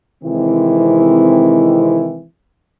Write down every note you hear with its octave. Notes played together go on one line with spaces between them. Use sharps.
C3 D#3 E3 G#3 C4 E4